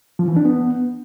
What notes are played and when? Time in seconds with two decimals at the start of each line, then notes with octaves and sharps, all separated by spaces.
0.19 F3
0.28 E3
0.36 D4
0.45 B3